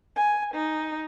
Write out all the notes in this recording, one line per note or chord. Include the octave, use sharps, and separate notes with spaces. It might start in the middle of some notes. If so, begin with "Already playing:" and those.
G#5
D#4